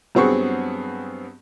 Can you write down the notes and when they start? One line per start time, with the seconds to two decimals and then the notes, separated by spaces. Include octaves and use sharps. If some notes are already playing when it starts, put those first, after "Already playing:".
0.15 G2 F#3 B3 C4 G#4 C#6